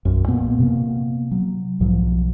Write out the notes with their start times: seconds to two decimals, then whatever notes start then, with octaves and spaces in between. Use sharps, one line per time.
0.05 B1 F#2
0.28 A#2 A#3 B3
0.60 C3 A#3
1.31 F#3
1.80 B1 G#2 F3 F#3